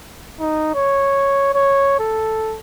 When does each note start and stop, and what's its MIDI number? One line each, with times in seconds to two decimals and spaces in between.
0.40 0.70 63
0.74 1.50 73
1.54 1.97 73
2.00 2.58 69